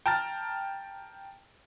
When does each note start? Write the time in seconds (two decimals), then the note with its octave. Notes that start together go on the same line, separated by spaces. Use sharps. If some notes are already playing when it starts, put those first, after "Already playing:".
0.06 G5 A5 A#5 F6 A6